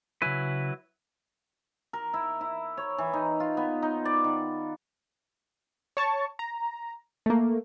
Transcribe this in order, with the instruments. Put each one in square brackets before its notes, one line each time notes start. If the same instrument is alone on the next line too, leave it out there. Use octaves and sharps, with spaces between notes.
[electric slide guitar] C#3 G#5 [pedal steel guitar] F#3 E4 B4
[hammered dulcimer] A#4
E4
E4
C#5
E3
D#4
F4
B3
D#4
D5
D#3
[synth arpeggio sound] C#5 A5 C#6
A#5
A3 A#3